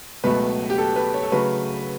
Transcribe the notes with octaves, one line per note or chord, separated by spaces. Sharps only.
C#2 B2 F#3 A3 B4
G4
A4
B4
C#5
A4
C#3 F#3 A3 B4